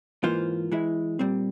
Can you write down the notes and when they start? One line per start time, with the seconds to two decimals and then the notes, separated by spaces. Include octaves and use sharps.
0.23 G#2 E3 A#3 F4 C5
0.72 E3 G#3 E4
1.19 A#2 G3 C4